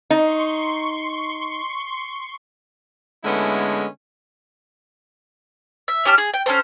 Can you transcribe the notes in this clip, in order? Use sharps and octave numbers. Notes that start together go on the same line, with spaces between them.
D#4 C6 C#6
D3 G#3 A3 B3 C#4 E4
E5
C#4 G4 A5 F6
G#4
G5
C#4 D4 A4 C5